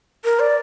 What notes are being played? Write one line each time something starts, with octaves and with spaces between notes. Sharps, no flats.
A#4
D5